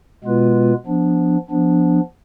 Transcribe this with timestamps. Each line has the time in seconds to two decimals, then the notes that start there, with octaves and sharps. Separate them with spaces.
0.24 B2 G#3 B3 F4 B4
0.86 F3 B3 D4
1.50 F3 B3 D4